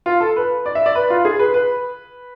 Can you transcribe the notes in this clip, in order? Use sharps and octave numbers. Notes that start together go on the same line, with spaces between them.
F4
A4
B4
D5
E5
D5
B4
F4
G#4
B4
B4